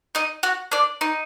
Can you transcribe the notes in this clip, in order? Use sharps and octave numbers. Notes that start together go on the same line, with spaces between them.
D#4 D#5
F#4 F#5
D4 D5
D#4 D#5